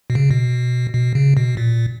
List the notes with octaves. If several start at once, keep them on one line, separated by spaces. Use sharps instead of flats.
B2
C#3
B2
B2
C#3
B2
A#2